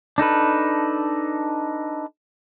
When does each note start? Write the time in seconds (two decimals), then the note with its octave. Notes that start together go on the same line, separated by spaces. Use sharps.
0.18 D4 D#4 A4 B4